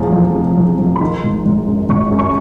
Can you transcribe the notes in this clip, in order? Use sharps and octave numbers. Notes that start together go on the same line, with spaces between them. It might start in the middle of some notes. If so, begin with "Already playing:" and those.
Already playing: F1 E2 F3
F3
C3
F3
F3
B5
D#3 C6
G#1
G#1
F#2
G#1 C#6
F#2
C#6